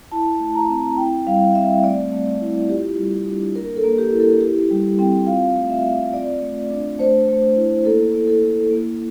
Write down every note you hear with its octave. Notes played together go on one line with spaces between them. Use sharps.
E4 A5
A3
A#5
C4
E4 G5
G3 F5
C4 E5
A3 D5
A3
E4
F4 G4
G3
D4
A#3 A#4
A4
A#3
G4
E4
A4
E4 G4
G3
C4 G5
F4 F5
A3
E5
C4
F4 D5
A3
D4
A3 C5
A3
E4
A#3 A4
A#3
A4
E4
A#3